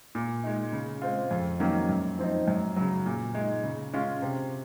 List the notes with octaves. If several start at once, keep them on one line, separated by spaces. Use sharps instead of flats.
A#2
G#3 D#4
C#3
G#3 C4 F4
F2
D#3 F#3 A#3 C#4
F#2
F3 C4 D#4
F#2
C#3 F#3
A#2
G#3 D#4
C#3
G#3 C#4 F4
C3